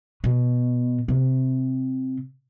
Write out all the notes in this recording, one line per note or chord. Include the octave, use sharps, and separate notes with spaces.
B2
C3